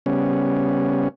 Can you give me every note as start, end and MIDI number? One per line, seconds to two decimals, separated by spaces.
0.06 1.08 49
0.06 1.08 55
0.06 1.08 59
0.06 1.08 61